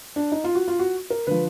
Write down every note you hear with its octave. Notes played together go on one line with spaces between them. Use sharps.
D4
D#4
F4
F#4
F4
F#4
A#4
D3 F3 B4